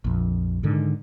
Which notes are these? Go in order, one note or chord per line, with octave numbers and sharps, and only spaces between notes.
A#1 F2
G#2 D3 D#3